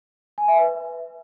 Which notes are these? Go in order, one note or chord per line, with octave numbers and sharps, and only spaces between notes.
G#5
E5
B4